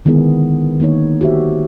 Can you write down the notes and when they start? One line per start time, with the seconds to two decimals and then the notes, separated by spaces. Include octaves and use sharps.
0.05 D3 D#3 G#3 B3 E4 G#4
0.80 D#3 A#3 D#4 C#5
1.21 F#4 G4 C5 E5